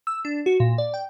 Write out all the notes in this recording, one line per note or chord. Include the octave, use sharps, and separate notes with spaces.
E6
D4
F#4
A#2
D5
G5